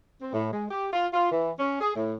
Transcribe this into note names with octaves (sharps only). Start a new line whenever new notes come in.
C4
A2
G#3
G4
F4
F4
E3
C#4
G#4
A2